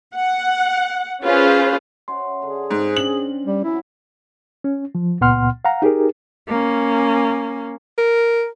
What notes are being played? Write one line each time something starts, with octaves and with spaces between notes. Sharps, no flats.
F#5
C#4 F4 G#4 B4 C5
C#4 E5 F#5 C6
D3 G#4
G#2 C4
C#4 D4 F#7
G3
E3 F#3 E4
C#4
F3
C#2 A#2 B3 F#5 C6 F6
F5 F#5 A#5
D#4 G4 G#4 A#4
A#3 C#4
A#4